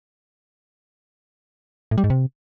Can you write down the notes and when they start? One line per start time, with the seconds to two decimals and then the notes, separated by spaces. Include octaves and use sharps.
1.91 A2
1.98 G3
2.04 G#2
2.10 C3